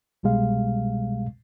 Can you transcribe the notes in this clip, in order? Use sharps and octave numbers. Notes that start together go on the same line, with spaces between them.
C2 B2 G3 G#3 F5